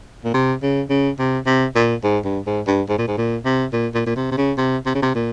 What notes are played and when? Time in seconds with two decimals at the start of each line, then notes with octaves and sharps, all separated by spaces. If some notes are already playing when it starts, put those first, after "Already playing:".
0.24 A#2
0.34 C3
0.62 C#3
0.90 C#3
1.19 C3
1.46 C3
1.75 A#2
2.03 G#2
2.25 G2
2.46 G#2
2.67 G2
2.89 G#2
2.98 A#2
3.08 G#2
3.17 A#2
3.45 C3
3.73 A#2
3.94 A#2
4.06 A#2
4.16 C3
4.31 C3
4.38 C#3
4.58 C3
4.86 C3
4.95 C#3
5.02 C3
5.15 A#2